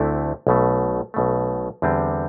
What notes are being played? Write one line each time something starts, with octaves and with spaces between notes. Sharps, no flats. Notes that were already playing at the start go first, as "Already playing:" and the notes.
Already playing: D2 D3 A3 C4 E4
B1 B2 A3
B1 B2 A3
E2 D3 G3 C4